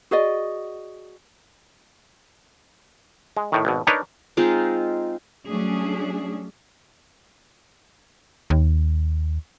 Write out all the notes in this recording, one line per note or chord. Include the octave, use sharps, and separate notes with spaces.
F#4 G#4 D5 D#5
G#3
A2 D#3
G#1 B2
D4 D#4 A#4 B4 C#5
G#3 C4 D#4 F4
F#3 G3 A3 C#4 D4 G#4
D#2